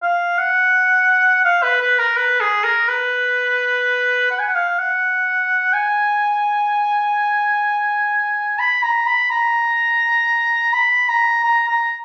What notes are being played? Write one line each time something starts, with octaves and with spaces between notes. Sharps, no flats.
F5
F#5
F5
B4
B4
A#4
B4
G#4
A#4
B4
F#5
G#5
F#5
F5
F#5
G#5
B5
A#5
B5
A#5
B5
A#5
A#5
A#5